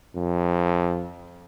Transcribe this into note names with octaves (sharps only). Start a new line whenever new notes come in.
F2